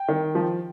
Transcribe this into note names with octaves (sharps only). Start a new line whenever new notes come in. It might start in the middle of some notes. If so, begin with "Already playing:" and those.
Already playing: G5
D#3
F3